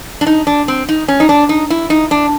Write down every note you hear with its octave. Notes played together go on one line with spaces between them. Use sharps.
D4
D#4
D4
C4
D#4
C#4
D#4
D4
D#4
E4
D#4
D4